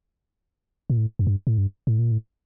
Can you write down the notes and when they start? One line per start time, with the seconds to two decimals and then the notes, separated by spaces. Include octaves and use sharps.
0.90 A#2
0.97 A2
1.19 F#2
1.27 G2
1.47 A2
1.58 G2
1.87 A2
1.99 A#2
2.12 A2